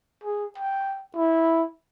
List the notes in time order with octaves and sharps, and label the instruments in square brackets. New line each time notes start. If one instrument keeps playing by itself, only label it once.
[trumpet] G#4
G5
E4